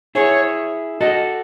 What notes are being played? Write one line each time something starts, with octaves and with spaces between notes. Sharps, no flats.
E4 G#4 C#5
F#4 A4 D#5